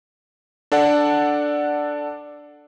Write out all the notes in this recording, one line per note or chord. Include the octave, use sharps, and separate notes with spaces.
D4 A4 D5 F#5